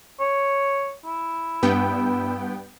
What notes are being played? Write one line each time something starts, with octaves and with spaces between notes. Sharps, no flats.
C#5
E4
G2 B3 G5